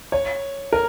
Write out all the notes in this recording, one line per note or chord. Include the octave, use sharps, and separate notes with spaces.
C#5
A#4